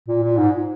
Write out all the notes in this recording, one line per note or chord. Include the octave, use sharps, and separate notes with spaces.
A#2
A#2
G#2